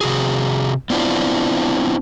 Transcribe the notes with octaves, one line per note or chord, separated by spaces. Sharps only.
C3 F#4 G#4
B3 C4 D4 E4 F4